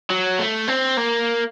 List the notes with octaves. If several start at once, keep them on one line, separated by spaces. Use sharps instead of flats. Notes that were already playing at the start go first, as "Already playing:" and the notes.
F#3
A3
C4
A#3